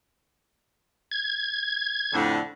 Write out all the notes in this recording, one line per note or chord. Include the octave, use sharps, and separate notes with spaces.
G#6
F2 A2 D3